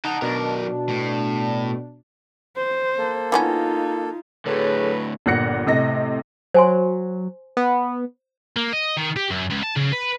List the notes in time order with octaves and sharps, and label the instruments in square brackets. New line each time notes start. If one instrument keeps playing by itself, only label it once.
[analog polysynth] D#4 [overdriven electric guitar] F#5 A5
[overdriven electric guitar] B1 A#4 [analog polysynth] B2 D4
[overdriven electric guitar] A2
[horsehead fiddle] C5
[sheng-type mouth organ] A#3 A4
[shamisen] E3 B3 C#4 [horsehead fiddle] D#4 F4
[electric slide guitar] A2 D3 [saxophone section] F#3 B4 [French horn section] G#4 A4 C#5
[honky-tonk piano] G1 A#2 F#5 F#6 A#6 C#7
A2 C3 D#5 A#6
[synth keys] F#3 [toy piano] C5 G#5 C6
[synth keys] B3
[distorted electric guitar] A#3
D#5
D#3
G4
F#2
C#2
A5
C#3
B4